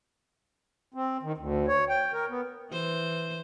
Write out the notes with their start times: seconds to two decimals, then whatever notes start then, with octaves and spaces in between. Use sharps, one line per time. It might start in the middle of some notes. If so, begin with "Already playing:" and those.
0.94 C4
1.23 D#3
1.38 D2
1.68 C#5
1.89 G5
2.13 A#4
2.30 B3
2.71 E3 C5